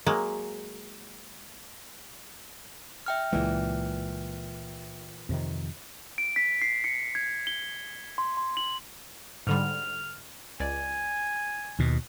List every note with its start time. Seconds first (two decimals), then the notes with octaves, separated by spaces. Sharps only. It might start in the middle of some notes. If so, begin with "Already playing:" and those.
0.06 F#3 G#3 A#3
3.06 E5 G5 F6
3.33 C#2 A#2 E3 G#3
5.29 F2 C3 D#3
6.18 D7
6.36 B6
6.62 C7
6.84 C#7
7.15 G#6
7.47 G7
8.18 C6
8.37 C6
8.57 F#7
9.47 G#2 D3 G3 F6
10.60 C#2 D5 G#5
11.79 D#2 B2